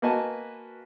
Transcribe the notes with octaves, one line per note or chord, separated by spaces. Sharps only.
A#3 F#4 B4 D#5 G#5 A5